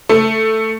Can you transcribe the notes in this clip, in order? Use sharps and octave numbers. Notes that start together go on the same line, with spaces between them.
A3